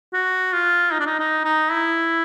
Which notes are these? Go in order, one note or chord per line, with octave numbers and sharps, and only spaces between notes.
F#4
F4
D#4
D4
D#4
D#4
D#4
E4